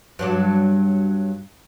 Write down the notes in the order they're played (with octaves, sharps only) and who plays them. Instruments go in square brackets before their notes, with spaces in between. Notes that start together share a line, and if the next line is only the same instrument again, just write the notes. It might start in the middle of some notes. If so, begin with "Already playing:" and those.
[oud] G2 F#3 D4